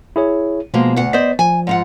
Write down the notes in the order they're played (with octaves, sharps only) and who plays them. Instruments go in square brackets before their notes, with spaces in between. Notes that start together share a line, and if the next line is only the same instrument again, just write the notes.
[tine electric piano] E4 G#4 C#5
[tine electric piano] B2 B3 [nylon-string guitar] F3 G#3 A#3
[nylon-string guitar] D2 F#5
[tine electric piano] B3 D#5 B6 [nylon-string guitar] C5 D5
[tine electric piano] F3 [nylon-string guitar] G#5
[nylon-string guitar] G#2 F4 F#5